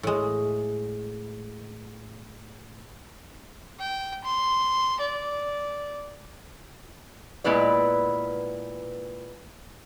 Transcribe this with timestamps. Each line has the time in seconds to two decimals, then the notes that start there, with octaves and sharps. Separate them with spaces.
0.03 A2 G#3
3.79 G5
4.24 C6
4.99 D5
7.44 A#2 G#3 B3 E4 B4 D5